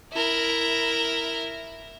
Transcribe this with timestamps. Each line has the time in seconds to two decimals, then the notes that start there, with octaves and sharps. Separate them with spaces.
0.13 E4 A#4